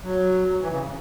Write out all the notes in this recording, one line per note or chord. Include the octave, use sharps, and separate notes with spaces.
F#3
E3
C#3